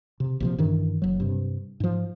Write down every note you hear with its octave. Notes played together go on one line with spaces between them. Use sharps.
C3
A#1 C3 F3
G2 D#3 E3
F#1 F#3
G2 C3
G#2 F3